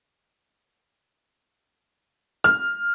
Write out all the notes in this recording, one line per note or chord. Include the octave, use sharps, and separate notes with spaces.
F6